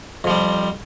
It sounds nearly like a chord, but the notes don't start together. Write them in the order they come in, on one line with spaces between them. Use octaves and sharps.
F2 F3 G3